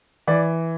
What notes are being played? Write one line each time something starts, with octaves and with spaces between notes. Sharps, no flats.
E3 D5